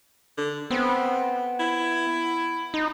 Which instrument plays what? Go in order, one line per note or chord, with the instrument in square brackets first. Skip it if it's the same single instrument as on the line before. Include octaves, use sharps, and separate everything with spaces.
[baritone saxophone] D3
[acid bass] B3 [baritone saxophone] C4
[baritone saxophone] E4
[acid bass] D#4